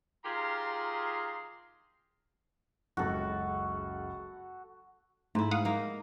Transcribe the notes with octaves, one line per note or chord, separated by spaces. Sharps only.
D#3 F4 G4 G#4 A#5 C6
F#1 C#2 F#4 A4
G#2 A3 E4
F5 F#5 D#6
A#3 D#4